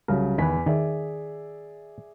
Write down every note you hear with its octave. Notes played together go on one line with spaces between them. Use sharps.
C2 C#3 F#3 A#4
E2 D#3 B4 G#5 B6
D#3 G#4 D5 E5